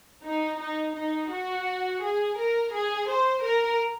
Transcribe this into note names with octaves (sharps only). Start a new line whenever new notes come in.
D#4
D#4
D#4
F#4
G#4
A#4
G#4
C5
A#4